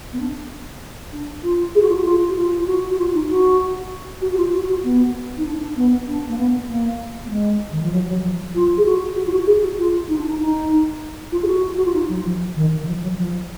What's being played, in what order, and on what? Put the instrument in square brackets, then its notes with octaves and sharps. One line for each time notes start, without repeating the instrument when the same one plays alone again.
[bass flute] B3
D4
D4
F4
G#4
F#4
F4
F#4
F4
F#4
F4
F4
F#4
F#4
F4
D#4
F#4
F#4
F#4
F4
F#4
F#4
B3
D#4
D4
D4
B3
D4
A#3
B3
A#3
A#3
G#3
D#3
F3
F#3
F#3
F3
F#3
F4
G#4
F#4
F#4
F4
F#4
G#4
F#4
F4
D#4
D4
D#4
D#4
F4
G#4
F#4
F#4
F4
D#4
F#3
F3
D#3
D#3
F3
F#3
F3